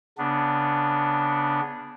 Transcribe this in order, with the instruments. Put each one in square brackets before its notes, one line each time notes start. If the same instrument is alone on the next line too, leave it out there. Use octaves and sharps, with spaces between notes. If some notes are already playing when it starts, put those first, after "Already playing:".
[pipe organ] C#3 B3 D4